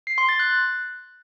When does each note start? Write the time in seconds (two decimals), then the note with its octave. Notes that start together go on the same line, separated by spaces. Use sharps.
0.07 C7
0.18 C6
0.29 A6
0.39 F#6